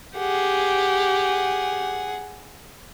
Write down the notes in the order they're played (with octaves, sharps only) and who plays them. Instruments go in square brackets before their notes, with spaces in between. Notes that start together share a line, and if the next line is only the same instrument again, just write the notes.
[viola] G4 [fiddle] G#4 F#5